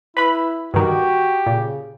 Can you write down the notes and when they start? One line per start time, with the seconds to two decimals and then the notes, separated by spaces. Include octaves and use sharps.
0.17 E4 B4 B5
0.74 G2 D#3 F#4 G4
1.46 A#2 C#3